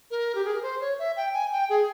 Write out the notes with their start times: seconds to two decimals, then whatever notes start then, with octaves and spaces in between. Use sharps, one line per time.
0.11 A#4
0.35 G4
0.45 G#4
0.54 A#4
0.62 C5
0.81 C#5
0.99 E5
1.16 G5
1.34 G#5
1.52 G5
1.69 G#4